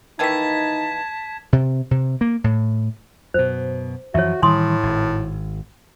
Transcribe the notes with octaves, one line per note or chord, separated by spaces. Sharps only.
D#3 E3 A#3 D#4 A5 G#6 B6
C3
C3
A#3
A2
F#2 B2 C5
F#2 E3 F3 F#4 C#5 E5
A2 D#3 E3 G3 G#5 C6 D#6
G#1